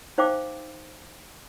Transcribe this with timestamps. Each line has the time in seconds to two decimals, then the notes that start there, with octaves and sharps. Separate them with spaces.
0.18 D#4 C5 F5 G5 D6